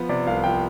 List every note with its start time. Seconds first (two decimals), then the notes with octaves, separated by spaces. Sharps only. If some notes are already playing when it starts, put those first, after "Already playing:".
Already playing: F3 B3
0.09 C3 D5
0.27 C2 F5
0.44 F3 G5